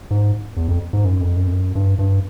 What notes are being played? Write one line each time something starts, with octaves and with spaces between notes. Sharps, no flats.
G#2
E2
F2
G#2
F#2
F2
F#2
F2
F#2
G2
G2